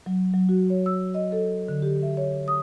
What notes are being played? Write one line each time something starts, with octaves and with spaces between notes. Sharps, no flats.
F#3
F#3
F#4
C#5
E6
D#5
A4
D3
G4
E5
C#5
D#6